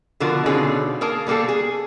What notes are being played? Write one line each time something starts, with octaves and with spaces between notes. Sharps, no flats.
B2 D3 F3 F4 F#4 A#4
B2 D3 C#4 D#4 F4 G#4
A#3 G#4 A#4 A5
B2 G3 A#3 G#4 A4
G#4